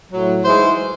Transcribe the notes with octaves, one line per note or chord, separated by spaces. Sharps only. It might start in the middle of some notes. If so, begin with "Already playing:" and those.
A2 F#3
G#2 E3 G#3 C5